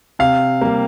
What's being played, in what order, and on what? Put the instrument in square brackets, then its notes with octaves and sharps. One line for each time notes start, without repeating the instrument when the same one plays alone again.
[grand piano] C3 F5
G3 A#3